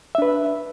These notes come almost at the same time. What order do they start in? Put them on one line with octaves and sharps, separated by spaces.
E5 D4 B4